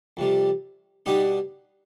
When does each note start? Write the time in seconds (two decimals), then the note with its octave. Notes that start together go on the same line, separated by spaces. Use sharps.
0.17 F2 C3 G3
1.06 B2 G3 B3 D4 D#4 G4